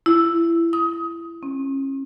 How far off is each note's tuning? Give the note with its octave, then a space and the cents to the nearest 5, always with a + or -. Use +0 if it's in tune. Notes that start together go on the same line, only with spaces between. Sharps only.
E4 +25
D#6 +20
C#4 -35